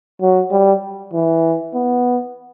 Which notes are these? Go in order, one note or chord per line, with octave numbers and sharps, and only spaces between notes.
F#3
G3
E3
B3